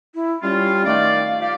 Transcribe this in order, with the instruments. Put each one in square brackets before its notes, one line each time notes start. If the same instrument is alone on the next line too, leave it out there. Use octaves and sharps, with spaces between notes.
[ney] E4
[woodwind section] G3 F4 [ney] C#4
[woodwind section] D#3 A3 D5 [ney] F5
[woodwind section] F4 G4 D5